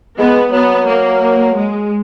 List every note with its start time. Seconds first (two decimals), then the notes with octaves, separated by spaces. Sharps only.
0.18 G#3 B3
0.52 F#3 B3
0.87 A#3
1.56 G#3